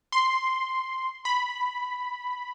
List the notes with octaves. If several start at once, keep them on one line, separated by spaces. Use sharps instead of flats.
C6
B5